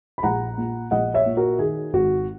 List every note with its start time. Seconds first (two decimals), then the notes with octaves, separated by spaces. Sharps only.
0.18 B5
0.23 A#1 F#5 A#5
0.58 A#2
0.91 A#1 D#5 F#5
1.14 C#5 E5
1.26 A#2
1.37 F#4 A#4
1.59 D#3 G#4
1.93 G#1 F#4